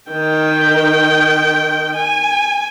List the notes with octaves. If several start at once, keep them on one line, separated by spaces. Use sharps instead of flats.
D#3 G5
G#5